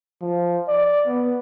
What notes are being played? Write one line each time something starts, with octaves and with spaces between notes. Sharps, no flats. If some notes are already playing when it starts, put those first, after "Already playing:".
F3
D5
B3